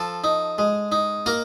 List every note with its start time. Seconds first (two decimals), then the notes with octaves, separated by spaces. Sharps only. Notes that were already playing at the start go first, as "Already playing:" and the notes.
Already playing: F3 A4 A5
0.24 D#4
0.58 G#3
0.92 D#4
1.26 A#3 A#4 A#5